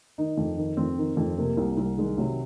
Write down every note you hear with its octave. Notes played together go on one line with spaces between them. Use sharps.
D#3 D#4
F2
D#3
F2 C4
D#3
F2
C3 A#3
C2
C2
D#3 G#3
C3 F#3